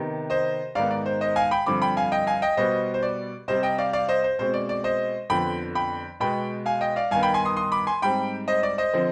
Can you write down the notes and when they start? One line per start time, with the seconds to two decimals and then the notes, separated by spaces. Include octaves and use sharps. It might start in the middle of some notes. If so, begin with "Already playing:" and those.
Already playing: C3 D#3 B3
0.30 C5 D#5
0.75 G#2 D#3 B3 D5 F5
0.91 D5
1.06 C5
1.21 C5 D#5
1.36 F5 G#5
1.51 G5 B5
1.66 G2 D3 F3 C4 B5 D6
1.82 G5 B5
1.97 F5 G#5
2.12 D#5 G5
2.27 F5 G#5
2.42 D#5 G5
2.57 B2 G3 B3 C5 D#5
2.94 C5
3.03 D5
3.48 C3 G3 C4 C5 D#5
3.63 D#5 G5
3.78 D5 F5
3.93 D5 F5
4.08 C5 D#5
4.24 C5
4.39 B2 G#3 C4 C5
4.54 D5
4.69 D5
4.84 C5 D#5
5.30 F2 D3 F3 B3 G5 B5
5.75 G5 B5
6.20 B2 G#3 B3 G5 B5
6.66 F5 G#5
6.81 D#5 G5
6.96 D5 F5
7.11 G2 D#3 B3 F5 G#5
7.23 G5 B5
7.34 G#5 C6
7.45 C6 D#6
7.57 C6 D#6
7.72 B5 D6
7.87 G#5 C6
8.02 G#2 G3 C4 G5 B5
8.48 C5 D#5
8.63 D5
8.78 C5 D#5
8.93 D3 F3 C4